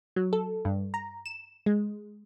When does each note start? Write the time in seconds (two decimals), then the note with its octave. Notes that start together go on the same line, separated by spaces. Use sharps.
0.16 F#3
0.33 A4
0.65 G2
0.94 A#5
1.26 E7
1.66 G#3